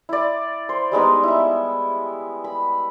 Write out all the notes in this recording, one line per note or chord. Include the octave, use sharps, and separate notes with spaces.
E4 D5
C5
G3 G#3 B3 D#4
E4 E5
B5